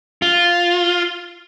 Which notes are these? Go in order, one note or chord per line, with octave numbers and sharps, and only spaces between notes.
F4